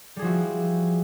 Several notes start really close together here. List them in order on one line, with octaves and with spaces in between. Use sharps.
G3 G#4 F3 F#4 E4